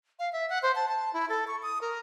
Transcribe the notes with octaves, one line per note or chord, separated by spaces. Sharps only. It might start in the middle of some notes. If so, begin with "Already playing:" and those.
F5
E5
F#5
C5
A5
A5
E4
A4
C#6
D#6
A#4